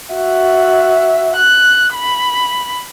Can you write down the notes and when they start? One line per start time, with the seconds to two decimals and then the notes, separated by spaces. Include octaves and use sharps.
0.14 F#4 E5
1.36 F#6
1.94 B5